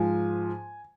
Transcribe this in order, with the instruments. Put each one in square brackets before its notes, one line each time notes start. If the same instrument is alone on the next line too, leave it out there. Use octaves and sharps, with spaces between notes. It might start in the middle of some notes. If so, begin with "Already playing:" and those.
Already playing: [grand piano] G#2 F3 G#5